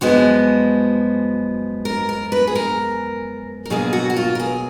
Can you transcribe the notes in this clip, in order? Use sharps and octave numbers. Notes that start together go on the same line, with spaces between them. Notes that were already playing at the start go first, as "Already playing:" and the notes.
F#2 F3 G#3 B3 F#4
A#4
A#4
B4
G#4
A#4
A#4
B2 F#3 A#3 G#4
F#4
F#4
F4
A#4
G#4